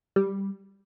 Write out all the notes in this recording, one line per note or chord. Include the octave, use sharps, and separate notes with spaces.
G3